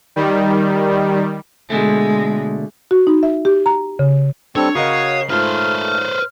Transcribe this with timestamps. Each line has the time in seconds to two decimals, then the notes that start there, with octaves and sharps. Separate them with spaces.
0.16 D#3 G3
1.70 B2 D3 G#3 A3
2.91 F#4
3.07 D#4
3.23 E5
3.45 G4
3.66 A#5
3.99 C#3
4.56 G3 C4 D4 A4 C#5
4.75 C#3 F#4 A#4 D#5 F5 D#6 C7
5.30 G#2 A3 F4 B4 C5 F6